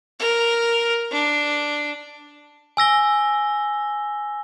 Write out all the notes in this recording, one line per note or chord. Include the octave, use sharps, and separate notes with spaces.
A#4
D4
G#5 E6 A#6 G7